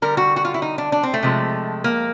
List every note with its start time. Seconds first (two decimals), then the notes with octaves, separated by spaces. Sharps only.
0.02 D3 G3 A#4
0.17 F#4
0.36 F#4
0.45 F4
0.54 E4
0.62 D#4
0.78 D4
0.92 D4
1.03 C4
1.14 A3
1.23 C3 F3 G#3
1.84 A#3